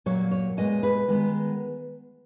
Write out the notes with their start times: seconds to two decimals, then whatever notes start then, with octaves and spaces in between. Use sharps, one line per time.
0.06 A#2 F#3 A#3 C#5
0.31 C#5
0.57 A#2 G#3 B3 D#5
0.83 B4
1.08 D#3 G#3 B3